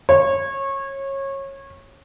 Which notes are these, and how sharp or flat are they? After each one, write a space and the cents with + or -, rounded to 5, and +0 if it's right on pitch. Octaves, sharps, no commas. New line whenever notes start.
C#5 -25